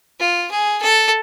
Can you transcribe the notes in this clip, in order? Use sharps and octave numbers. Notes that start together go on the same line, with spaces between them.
F4
G#4
A4